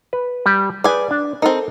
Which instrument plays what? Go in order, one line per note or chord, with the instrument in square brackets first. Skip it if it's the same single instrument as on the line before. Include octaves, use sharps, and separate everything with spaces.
[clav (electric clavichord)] B4
G3 G4
[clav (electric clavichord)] G#4 B4 [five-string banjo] D5 G#5
[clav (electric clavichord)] D4
[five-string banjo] C4 D#4 [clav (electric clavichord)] A4 A#4